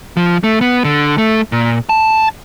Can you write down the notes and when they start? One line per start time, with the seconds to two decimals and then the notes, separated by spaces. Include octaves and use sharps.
0.17 F3
0.44 A3
0.61 B3
0.84 D3
1.18 A3
1.52 A#2
1.89 A5